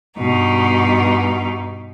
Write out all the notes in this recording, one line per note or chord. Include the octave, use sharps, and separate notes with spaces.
G2 B2 D#4